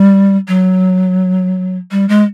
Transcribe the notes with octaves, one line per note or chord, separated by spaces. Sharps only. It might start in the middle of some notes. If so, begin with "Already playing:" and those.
Already playing: G3
F#3
G3
G#3